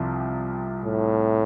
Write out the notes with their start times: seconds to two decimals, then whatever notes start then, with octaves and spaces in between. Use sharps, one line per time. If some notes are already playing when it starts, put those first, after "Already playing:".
Already playing: C2 C3 F3
0.84 A2